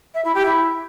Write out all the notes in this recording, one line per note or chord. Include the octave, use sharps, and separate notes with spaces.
E5
E4
G4
E4